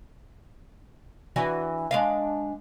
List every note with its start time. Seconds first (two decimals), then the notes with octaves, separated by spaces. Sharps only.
1.36 E3 D4 F#4
1.91 G#3 D4 F5